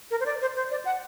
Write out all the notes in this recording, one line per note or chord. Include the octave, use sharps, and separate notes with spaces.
A#4
C5
D5
C5
C5
D5
F#5